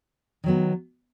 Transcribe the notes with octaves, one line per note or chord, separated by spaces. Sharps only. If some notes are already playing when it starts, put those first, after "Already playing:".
D#3 F#3 B3